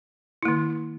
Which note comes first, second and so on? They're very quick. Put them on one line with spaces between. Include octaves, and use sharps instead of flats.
E4 A#3 D#3